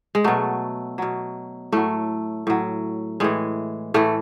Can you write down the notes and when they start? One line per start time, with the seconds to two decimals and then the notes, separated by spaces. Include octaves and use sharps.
0.15 G#3
0.24 B2 F#3 A3
0.98 B2 F#3
1.72 A2 F#3 A3
2.47 A2 F#3
3.20 A2 E3 G#3
3.94 A2 E3 A3